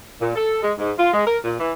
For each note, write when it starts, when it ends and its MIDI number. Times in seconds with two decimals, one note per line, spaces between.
0.20 0.32 46
0.35 0.60 69
0.62 0.72 56
0.78 0.92 44
0.98 1.13 65
1.13 1.25 56
1.26 1.37 70
1.44 1.57 46
1.59 1.73 52